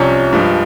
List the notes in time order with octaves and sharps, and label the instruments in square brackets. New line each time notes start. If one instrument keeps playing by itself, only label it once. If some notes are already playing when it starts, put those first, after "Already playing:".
Already playing: [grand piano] C2 C3 F3 C#4
G2 F3 G#3